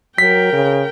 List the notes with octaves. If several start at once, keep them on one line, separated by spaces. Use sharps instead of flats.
F#3 A#4 G5 B6
C#3